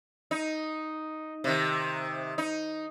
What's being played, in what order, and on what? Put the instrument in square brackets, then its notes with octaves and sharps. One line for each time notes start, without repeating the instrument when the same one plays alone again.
[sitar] D#4
C3 D#3
D#4